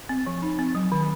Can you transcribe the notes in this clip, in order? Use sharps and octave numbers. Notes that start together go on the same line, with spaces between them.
C4
F3
D#4
C4
F#3
D#3